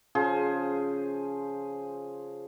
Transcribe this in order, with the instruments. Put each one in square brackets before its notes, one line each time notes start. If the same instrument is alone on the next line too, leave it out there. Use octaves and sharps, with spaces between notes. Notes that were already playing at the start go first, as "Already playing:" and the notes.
[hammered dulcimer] C#3 F3 G#4 C5